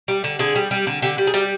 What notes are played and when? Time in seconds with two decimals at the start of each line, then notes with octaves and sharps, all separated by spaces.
0.08 G3
0.24 D3
0.39 D3 G#4
0.56 G3
0.71 G3
0.87 D3
1.02 D3 G4
1.18 G3
1.27 G#4
1.34 G3 G4